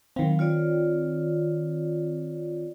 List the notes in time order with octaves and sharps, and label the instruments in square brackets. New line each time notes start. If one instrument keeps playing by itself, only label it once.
[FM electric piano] D#3 C4 [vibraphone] F#3 F5
[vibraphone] F4 C#5 D5